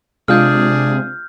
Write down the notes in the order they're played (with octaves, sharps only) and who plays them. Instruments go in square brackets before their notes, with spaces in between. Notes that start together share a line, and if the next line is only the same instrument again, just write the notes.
[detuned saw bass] C3 [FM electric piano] G#3 F4 [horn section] D4 G#4 [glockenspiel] F6 G6